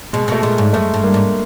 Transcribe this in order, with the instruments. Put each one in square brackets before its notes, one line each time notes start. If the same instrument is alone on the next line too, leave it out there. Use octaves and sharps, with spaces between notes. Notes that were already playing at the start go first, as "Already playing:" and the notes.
[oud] B2 [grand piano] G#3
[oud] B2 [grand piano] A3
[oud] A#2 [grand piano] G#3
[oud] G#2
[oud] F#2 [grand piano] A3
[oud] G2
[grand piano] A#3
[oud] G#2